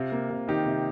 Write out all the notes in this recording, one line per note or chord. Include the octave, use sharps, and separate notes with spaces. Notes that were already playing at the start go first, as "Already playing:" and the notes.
Already playing: C3 F4
A#3
C3
D#3 D#4 G4
C3